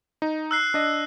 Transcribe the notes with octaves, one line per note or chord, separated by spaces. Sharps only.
D#4
E6 F#6 C7
D4 D#5